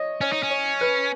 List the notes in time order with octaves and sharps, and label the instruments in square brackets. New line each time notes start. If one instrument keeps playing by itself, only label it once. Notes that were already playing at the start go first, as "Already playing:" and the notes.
Already playing: [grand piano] C#5 D#5
[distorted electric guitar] C#4 [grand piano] C#5
[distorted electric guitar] D#4
C#4
[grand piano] C#5
B4